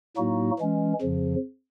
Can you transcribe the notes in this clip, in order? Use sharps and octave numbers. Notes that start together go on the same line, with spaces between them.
A2 F#3 A#3 D#4 F#4
E3 G#3 C#4
F2 C#3 F3